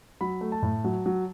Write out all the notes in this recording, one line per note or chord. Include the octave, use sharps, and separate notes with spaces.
F#3 B5
A3
A5
A2
F#3
F#3